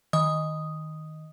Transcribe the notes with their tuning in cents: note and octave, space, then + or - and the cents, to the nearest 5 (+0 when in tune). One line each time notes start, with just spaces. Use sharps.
D#3 +5 D#5 +0 D#6 +0